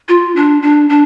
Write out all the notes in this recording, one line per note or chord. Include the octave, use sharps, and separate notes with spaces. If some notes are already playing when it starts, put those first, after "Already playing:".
F4
D4
D4
D4